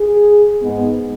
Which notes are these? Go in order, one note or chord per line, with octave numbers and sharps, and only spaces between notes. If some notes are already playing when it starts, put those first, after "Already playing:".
Already playing: G#4
G#2 G#3 B3